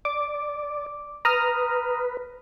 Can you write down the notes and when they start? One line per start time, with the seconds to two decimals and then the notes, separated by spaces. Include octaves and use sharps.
0.05 D5 D6
1.25 B4 A#5 D#6 F6